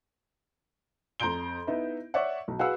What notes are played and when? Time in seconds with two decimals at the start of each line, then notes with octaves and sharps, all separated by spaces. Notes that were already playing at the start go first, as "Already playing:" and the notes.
1.20 F2 A#5 C6 G6 D7 G7
1.67 B3 D#4 E4
2.14 C#5 D5 E5 F#5
2.48 B1
2.59 F#4 G#4 B4 F5 F#5 E6